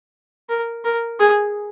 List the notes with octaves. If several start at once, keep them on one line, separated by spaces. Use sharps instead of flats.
A#4
A#4
G#4